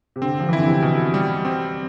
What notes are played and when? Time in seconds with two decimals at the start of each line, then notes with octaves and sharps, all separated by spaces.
0.16 C3
0.21 D3 C4
0.40 F3
0.49 E3 E4
0.58 D3
0.67 C3
0.82 B2
1.14 G3
1.45 C4